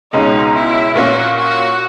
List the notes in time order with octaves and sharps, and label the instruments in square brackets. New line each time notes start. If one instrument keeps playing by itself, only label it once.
[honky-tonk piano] C#2 B2 G#3 C#4 [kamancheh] D#4
[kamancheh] E4
[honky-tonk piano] A#2 A#3 C#4 [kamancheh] F#4
[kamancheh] F#4